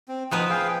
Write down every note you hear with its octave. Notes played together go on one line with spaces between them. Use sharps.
C4
F3 B3 D#4 B4 D#6
G#4 F5 G5